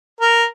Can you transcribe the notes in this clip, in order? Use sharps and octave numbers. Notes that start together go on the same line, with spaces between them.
A#4